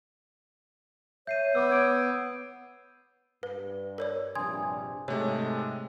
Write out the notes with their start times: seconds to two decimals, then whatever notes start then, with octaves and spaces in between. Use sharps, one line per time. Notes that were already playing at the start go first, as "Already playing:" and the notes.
1.27 C#5 E5 G6 C7 D#7
1.55 B3 B4 D6 E6
1.69 G6 G#6 D7
3.43 G2 B4
3.98 A#4 C#5 D5
4.35 A#1 G2 C3 G#5 C6 D#6 G#6
5.08 G#2 C3 G#3 A3 C4 C#5